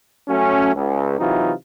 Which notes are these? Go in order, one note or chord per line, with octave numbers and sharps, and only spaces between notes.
F#3 A3 C#4
C#2
C3 E3 F#3 D#4 F4